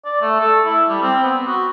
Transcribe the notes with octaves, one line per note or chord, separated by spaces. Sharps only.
D5
A3
A4
E4
G3
C4
B3
F#4